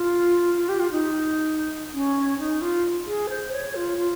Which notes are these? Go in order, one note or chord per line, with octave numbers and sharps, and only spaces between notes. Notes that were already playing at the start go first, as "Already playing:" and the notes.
Already playing: F4
F4
G4
F4
D#4
C#4
D#4
F4
G#4
C5
C#5
F4
F4